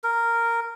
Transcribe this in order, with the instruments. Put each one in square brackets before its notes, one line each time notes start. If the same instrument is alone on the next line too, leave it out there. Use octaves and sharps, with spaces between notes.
[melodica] A#4